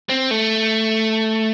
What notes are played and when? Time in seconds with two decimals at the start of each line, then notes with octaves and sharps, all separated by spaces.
0.09 C4
0.31 A3